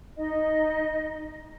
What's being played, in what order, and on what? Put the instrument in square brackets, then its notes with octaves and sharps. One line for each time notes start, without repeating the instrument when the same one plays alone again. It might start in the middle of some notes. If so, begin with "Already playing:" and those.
[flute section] D#4 D#5